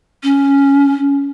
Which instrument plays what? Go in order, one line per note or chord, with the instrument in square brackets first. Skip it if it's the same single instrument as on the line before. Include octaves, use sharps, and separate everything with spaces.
[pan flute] C#4